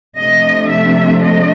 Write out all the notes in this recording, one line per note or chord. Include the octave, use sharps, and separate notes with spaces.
C3 F3 A3 D4 D#5
E5
D#5